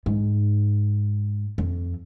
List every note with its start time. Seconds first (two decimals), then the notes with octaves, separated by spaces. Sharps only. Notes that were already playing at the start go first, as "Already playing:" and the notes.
0.06 G#2
1.58 F2